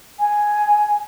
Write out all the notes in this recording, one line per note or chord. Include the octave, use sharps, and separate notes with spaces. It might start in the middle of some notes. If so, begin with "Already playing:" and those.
G#5